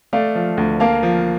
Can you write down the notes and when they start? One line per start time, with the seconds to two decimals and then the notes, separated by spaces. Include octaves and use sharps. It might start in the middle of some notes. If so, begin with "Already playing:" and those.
0.13 A3 D5 F5
0.35 F3
0.57 D2
0.80 A#3 F5 A5
1.03 F3